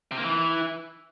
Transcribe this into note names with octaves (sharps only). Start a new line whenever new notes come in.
C3
A#3
E3